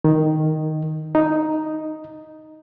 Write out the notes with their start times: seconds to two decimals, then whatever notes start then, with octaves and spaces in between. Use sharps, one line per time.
0.04 D#3
1.15 D#4